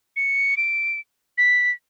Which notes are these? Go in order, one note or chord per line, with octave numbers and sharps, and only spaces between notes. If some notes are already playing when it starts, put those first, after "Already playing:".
C#7
D7
B6